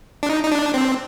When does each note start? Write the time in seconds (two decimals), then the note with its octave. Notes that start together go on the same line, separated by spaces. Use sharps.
0.23 D4
0.30 D#4
0.44 D#4
0.52 D4
0.74 C4